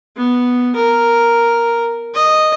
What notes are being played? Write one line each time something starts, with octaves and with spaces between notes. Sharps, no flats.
B3
A#4
D#5